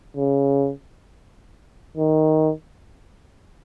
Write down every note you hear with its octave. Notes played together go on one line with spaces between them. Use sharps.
C#3
D#3